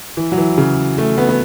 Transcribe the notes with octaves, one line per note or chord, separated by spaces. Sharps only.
E3
F#3
E3
C#3
A3
B3
B3